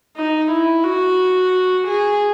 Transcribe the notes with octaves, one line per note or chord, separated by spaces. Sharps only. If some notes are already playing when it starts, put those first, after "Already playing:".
D#4
E4
F#4
G#4